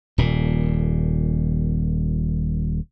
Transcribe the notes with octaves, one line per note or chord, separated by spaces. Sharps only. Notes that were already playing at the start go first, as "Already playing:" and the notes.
D#1 A#2